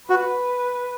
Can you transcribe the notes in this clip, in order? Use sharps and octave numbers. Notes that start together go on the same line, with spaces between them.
F#4 B4